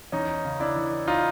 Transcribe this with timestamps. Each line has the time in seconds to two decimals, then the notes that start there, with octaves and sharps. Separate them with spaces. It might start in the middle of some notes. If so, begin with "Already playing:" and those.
0.12 E2 C#4 D#4
0.45 C#3
0.60 D4 E4
0.76 E3
1.07 D#4 F4